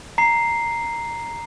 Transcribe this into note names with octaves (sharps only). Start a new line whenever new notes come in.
A#5 C7